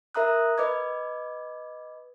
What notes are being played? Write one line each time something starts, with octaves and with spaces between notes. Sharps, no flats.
A#4 E5 A#5 D#6 F#6
B4 D#5 D6 G#6